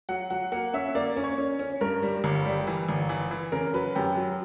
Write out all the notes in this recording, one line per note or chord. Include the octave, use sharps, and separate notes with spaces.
F#3 F#5
F#3 F#5
A#3 F#5
C#4 E5
A#3 D5
C#4
C#5
C#4
C#4
G2 A#4
G3
G1
G3
E3
G1
E3
E3
C#3 A#4
F#3 B4
F#2 G4
F#3